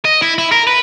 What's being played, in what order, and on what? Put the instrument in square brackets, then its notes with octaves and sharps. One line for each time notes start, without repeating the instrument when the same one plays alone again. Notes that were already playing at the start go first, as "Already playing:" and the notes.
[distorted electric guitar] D#5
E4
E4
A#4
B4